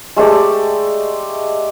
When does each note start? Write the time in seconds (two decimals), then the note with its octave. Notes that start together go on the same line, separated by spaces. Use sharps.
0.16 G#3 A3 G4 D5